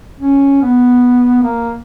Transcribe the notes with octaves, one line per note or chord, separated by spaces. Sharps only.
C#4
B3
A#3